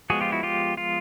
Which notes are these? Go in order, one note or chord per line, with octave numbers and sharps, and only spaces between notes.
F3 G#3 B3 F#4 G#4
F4 G4
E4 F#4
F4 G4
F4